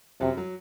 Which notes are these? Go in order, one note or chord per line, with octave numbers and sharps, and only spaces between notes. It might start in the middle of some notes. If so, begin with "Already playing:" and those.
F#2 C3 F#3
F#3